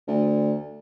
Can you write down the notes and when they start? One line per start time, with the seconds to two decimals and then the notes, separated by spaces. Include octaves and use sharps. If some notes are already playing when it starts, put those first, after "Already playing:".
0.07 D2